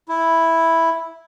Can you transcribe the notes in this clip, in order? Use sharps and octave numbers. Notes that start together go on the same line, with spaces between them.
E4